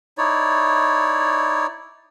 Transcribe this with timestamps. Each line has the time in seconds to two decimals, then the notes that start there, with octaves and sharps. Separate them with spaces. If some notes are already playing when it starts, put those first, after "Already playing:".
0.18 D#4 E4 C#5 D5